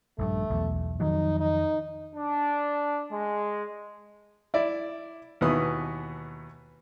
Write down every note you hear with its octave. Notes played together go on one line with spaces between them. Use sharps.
A#1 G2 A3
B1 E2
F2 D#3 F#3 D#4
D#4
D4
G#3
E4 D5
D#2 B2 E3 B3 D#6